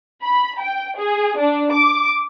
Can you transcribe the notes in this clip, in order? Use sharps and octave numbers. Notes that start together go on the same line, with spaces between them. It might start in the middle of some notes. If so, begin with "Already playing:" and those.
B5
G5
G#4
D4
D6